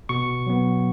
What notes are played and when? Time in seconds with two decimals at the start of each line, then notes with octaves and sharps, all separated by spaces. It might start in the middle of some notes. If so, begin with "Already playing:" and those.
0.09 B2 C#6
0.47 F#3 B3